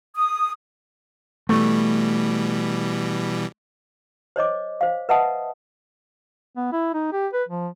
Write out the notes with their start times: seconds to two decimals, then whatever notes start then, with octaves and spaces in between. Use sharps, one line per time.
0.15 D#6
1.49 B2 E3 G3 A3
4.36 C5 C#5 D#5 D6
4.81 C5 F5
5.09 B4 D#5 E5 F#5 A5 D#6
6.57 B3
6.72 E4
6.94 D#4
7.12 G4
7.33 B4
7.48 F3